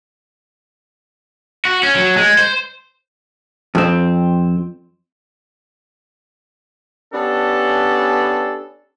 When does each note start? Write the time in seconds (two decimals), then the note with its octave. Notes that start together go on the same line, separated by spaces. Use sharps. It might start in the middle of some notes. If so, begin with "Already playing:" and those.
1.65 F#4
1.83 C#4
1.95 F#3
2.17 G#3
2.39 C5
3.75 F2 C4
7.13 B3 C#4 D4 G4 A4